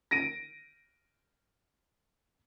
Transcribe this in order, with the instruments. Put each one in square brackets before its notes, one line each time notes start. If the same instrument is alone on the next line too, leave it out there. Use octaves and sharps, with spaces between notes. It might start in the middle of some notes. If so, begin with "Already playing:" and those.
[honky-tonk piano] A#6 D7 D#7